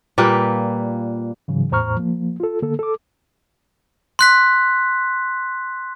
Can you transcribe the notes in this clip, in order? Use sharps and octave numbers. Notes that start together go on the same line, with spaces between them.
A#2 G3 A#3 B4
G#2 C#3 E3 F#3
E2 A2 C5 A#5 C#6 F6
F3 A#3
F4 A4
D3 A#3 A4
A4 D6
C6 F#6 B6